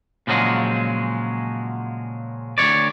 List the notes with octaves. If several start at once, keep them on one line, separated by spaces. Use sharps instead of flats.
A#2 C#3 F3 F#3 G#3
D2 C#3 C#5 D5